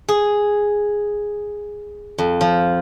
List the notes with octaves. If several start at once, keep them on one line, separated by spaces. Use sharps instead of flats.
G#4
F2
F3